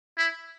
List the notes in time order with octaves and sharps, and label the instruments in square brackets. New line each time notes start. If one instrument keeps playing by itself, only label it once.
[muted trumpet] E4